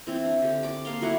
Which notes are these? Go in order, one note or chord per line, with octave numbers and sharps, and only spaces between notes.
E3 C4
D4
D3 G4
D5 D6
A#3 F5 C6
F#3 A3 E4 F#5